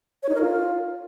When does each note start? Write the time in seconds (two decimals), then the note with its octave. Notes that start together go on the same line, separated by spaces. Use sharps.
0.23 C#5
0.29 D#4
0.35 A#4
0.41 F4